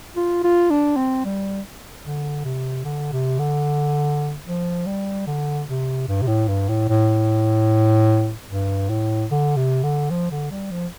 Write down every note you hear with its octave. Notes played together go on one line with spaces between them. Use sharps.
F4
F4
D4
C4
G3
D3
C3
D3
C3
D3
F3
G3
D3
C3
G2
C3
A2
G2
A2
A2
G2
A2
D3
C3
D3
F3
D3
G3
F3